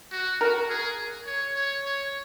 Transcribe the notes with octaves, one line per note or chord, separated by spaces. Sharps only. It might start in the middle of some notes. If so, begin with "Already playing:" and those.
F#4
F#4 A#4
G#4
C#5
C#5
C#5